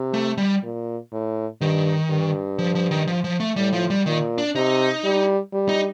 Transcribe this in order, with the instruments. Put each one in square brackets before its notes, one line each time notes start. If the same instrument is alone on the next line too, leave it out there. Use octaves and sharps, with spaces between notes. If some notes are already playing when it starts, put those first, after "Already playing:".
Already playing: [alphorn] C3
[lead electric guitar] A3
G3
[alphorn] A#2
A2
[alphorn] G2 [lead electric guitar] D#3
[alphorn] G2
[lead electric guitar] F3
F3
D#3
F3
F3
A3
[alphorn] A2 [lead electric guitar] G3
[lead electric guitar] F3
G3
[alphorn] A#2 [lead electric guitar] D#3
[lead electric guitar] D4
[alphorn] C3 [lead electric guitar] D#4
[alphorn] G3
G3
[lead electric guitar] D#4